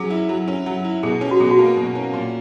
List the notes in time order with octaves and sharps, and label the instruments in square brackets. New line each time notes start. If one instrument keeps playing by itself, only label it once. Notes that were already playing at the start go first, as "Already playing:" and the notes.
Already playing: [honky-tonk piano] F#3 C#4 [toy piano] G#4
[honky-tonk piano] E4
F#3
C#4
F#3
E4
[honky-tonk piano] B2 [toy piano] G#4
[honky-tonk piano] C#4
[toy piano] F#4
[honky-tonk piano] B2 [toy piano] G#4
[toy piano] F#4
[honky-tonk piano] A#3
B2
C#4
A#2